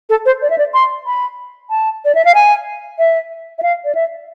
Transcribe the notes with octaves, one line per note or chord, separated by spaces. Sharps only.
A4
C5
D5
E5
D5
C6
B5
A5
D5
E5
F5
G#5
E5
E5
F5
D5
E5